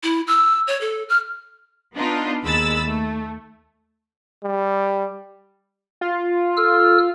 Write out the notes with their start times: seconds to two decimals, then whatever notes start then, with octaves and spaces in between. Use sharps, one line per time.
0.03 E4
0.27 E6
0.67 C#5
0.81 A4
1.09 F6
1.95 B3 D4 D#4 F4
2.44 D#2 G#3 B5 E6 A6
2.86 A3
4.43 G3
6.01 F4
6.57 A4 E6 F6